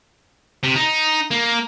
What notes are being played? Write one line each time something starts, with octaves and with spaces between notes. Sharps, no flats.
C3
D#4
A#3